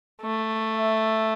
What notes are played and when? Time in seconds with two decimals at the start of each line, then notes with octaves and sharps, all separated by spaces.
0.22 A3
0.73 E5